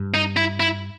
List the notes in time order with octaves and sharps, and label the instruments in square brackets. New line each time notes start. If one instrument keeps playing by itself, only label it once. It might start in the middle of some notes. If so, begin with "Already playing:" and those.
Already playing: [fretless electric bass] G2
[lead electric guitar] D#4
E4
E4